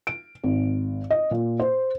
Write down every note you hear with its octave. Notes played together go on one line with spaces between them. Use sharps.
D7
G#1
D#5
A#2
C5